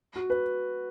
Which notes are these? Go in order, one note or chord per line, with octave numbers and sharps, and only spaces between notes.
F#4
B4